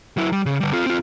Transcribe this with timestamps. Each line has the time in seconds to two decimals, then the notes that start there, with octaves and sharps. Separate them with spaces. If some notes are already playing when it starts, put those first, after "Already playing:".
0.17 F#3 E4
0.32 G3
0.46 C#3
0.60 D3 G3
0.72 C4 F4
0.86 C4 F4